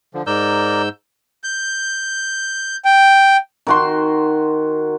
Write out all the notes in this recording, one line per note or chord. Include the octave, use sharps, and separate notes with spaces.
D3 F3
G#2 A#4 D5 E6 G6
G6
G5
D#3 F#4 C6